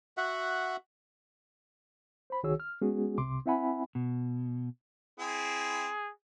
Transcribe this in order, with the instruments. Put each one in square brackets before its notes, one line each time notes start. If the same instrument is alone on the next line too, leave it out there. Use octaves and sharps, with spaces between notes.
[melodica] F#4 E5 F#5
[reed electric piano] C5 B5
C2 D#3 F#4 G#4 C#5 E6
F6
G#3 B3 C#4 F#4 G#4
C2 C3 C6 D6
C4 E4 E5 F#5 G#5 B5
[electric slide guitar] B2
[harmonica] C4 E4 [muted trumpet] G#4